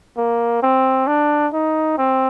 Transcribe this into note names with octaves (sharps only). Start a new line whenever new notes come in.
A#3
C4
D4
D#4
C4